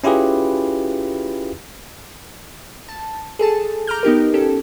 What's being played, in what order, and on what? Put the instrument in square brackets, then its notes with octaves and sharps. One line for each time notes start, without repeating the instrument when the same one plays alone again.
[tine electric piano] C#4 E4 F4 G4 G#4 B4
[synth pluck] A5
G#4 A4 A5
A#5 D6 F6 G6
B3 D#4 G4 A#4
C#4 G4 A4